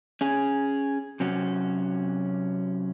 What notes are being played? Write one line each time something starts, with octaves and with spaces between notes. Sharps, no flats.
C#4 G#4
C3 F#3 C#4 F#4